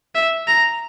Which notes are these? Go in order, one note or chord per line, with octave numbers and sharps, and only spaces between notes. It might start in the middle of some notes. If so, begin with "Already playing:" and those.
E5
A#5